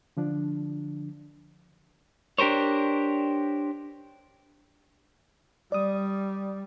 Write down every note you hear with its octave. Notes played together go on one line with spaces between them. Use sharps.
D3 F3 D4
D4 G4 A#4 C5 C#5
G3 D5 D#6